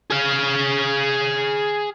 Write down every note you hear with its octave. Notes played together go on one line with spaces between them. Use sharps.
G#4 F5